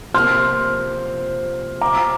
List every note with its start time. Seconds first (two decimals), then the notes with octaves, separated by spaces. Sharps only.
0.14 C3 F3 A#3 C6 F6
1.81 A#5 D6